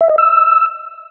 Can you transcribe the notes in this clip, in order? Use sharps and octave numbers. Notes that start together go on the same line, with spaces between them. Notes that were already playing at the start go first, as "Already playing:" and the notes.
E5
D#5
E6